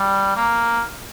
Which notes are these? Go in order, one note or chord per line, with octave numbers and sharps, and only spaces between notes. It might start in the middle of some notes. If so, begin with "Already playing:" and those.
Already playing: G3
A#3